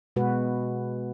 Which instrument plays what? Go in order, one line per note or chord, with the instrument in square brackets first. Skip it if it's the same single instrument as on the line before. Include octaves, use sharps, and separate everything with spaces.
[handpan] B2 G#3 F#4 B4